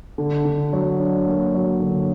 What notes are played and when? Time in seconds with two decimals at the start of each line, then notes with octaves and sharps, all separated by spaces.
0.18 D3
0.45 D3
0.73 F#3
1.00 D4
1.27 A#3
1.54 F#3
1.80 D3